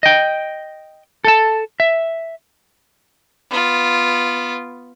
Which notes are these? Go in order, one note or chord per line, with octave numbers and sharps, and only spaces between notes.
D#5 G5
A4 A5
E5
B3 F4